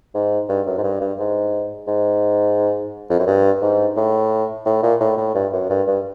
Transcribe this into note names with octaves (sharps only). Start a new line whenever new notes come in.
G#2
G2
F#2
G#2
G2
G2
G#2
G#2
F2
F#2
G2
G#2
A2
A2
A#2
A2
A2
G2
F#2
G2
G2